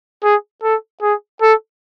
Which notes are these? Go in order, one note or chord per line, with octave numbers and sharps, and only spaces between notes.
G#4
A4
G#4
A4